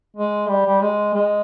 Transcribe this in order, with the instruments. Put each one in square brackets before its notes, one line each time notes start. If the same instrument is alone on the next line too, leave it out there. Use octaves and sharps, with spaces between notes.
[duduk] G#3
G3
G3
G#3
G#3